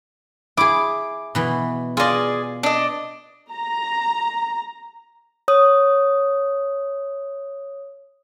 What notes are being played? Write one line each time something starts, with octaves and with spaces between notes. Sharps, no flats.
E4 G#4 D6
B2 E3
F4 G#4 D5 D#5
D4 D#5
A#5
C#5 D#6